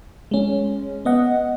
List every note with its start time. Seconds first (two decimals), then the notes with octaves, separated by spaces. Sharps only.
0.31 G#3 C#4
1.05 B3 D#5 F#5